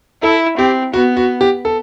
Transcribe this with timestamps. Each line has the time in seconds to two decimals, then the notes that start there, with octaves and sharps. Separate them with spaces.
0.22 E4 A4
0.58 C4 G4
0.93 B3 F#4
1.17 F#4
1.41 G4
1.65 A4